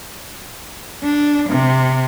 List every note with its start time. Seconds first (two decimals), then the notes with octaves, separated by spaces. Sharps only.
1.03 D4
1.49 C3